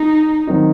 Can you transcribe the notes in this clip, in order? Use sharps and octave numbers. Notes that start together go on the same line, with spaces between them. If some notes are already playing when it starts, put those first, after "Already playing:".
Already playing: D#4
D#3 F#3 C4 D#4